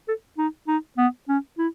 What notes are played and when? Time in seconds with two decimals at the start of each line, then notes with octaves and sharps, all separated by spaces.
0.08 A4
0.38 D#4
0.68 D#4
0.98 B3
1.28 C#4
1.58 E4